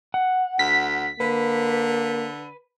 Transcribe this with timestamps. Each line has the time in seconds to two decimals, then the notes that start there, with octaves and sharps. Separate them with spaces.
0.14 F#5
0.59 D2 B6
1.20 D3 A#3 B4